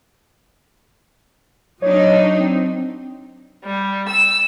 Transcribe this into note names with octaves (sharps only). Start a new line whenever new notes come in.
F#3 D4 D#4 C#5
C4
G3
E6